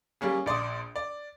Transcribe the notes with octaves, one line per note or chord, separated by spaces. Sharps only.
G3 A#3 C#4 G#4
A#1 D5 C6 D#6
D5